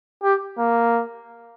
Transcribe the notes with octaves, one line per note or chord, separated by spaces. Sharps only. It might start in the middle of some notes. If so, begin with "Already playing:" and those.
G4
A#3